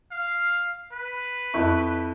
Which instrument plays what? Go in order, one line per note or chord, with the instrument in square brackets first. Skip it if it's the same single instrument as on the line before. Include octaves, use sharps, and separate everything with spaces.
[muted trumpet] F5
B4
[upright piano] F2 E4 C#6